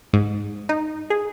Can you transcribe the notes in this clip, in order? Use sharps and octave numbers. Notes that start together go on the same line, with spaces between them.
G#2
D#4
G#4